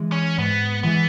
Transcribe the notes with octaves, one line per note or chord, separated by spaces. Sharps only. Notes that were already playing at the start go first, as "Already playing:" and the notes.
Already playing: E3 G#3
C#4
G#2 B3
E3 G#3 B3